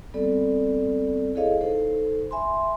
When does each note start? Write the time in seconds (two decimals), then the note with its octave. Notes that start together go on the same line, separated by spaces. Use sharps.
0.14 G3 B3 C4 A4 D5
1.35 E4 G#4 A4 C#5 D#5 F5
1.61 D#4 A4 C5
2.31 E5 G#5 B5 C6